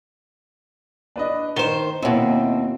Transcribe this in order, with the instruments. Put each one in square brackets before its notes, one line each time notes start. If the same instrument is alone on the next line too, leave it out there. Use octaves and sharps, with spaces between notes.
[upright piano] D4 B4 D#5
[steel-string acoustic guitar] D#3 C5 [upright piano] E7 G7
[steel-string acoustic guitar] D#2 B2 [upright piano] A#3 E4 [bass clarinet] C4